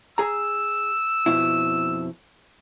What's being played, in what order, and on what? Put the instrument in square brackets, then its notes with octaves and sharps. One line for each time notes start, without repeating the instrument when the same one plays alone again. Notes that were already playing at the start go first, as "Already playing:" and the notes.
[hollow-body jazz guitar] G#4 A#5 [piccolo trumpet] E6
[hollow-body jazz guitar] F2 B2 E4